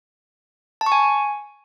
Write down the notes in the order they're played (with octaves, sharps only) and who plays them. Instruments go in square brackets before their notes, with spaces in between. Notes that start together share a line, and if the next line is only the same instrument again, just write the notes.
[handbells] A5
C#6
G#5